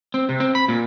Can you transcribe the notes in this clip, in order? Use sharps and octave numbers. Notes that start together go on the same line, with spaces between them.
C4
C3
C4
B5
A#2